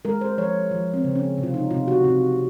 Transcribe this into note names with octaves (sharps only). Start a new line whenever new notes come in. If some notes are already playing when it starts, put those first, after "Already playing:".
G#3 A#4
C5
F3 C#5
F3
C4
C#3
C#4
C3
F4
D#4
C3 F4
F#4
C3